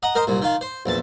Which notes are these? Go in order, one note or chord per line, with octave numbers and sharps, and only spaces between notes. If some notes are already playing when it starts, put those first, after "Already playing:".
D#5 F#5 A#5
A#4 C5 D#5
C2 A#2
D#3 F4
C5
A#1 E2 A5